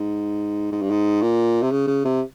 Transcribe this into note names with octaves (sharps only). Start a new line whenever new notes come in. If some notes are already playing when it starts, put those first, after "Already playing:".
Already playing: G#2
G#2
G2
G#2
A#2
C3
C#3
C#3
C3